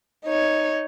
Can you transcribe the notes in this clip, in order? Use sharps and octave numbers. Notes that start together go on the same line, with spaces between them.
D#4 C#5